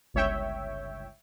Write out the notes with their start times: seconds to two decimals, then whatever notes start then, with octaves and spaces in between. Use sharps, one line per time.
0.14 G1 C#2 C#5 E5 G5